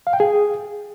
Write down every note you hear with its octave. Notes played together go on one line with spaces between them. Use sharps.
F5
G5
G#4